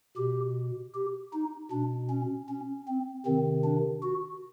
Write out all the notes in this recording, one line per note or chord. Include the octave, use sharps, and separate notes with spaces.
B2 G4
G4
D#4
B2 D4
C#4
C#4
C4
C3 D#3 C4
D4
F#4